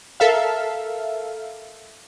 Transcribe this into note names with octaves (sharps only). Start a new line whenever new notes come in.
A4 A#4 E5 F5